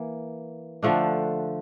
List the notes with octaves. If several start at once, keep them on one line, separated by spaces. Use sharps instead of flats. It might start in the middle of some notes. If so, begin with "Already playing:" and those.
Already playing: E3 A#3
D3 F3 A3 D4